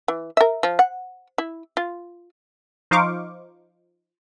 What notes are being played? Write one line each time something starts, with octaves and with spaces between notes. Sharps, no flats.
E3
A#4 E5
F3
F#5
E4
F4
F3 D#4 C5 F5 C#6 D6